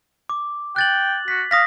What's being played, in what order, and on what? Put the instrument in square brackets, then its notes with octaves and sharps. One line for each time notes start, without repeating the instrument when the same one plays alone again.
[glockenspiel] D6
[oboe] G5 [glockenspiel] F#6 A6 F#7
[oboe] F#4 [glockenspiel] B6
[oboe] F5 [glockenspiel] D#6 A#6 B6